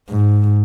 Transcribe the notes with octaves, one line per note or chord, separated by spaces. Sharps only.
G#2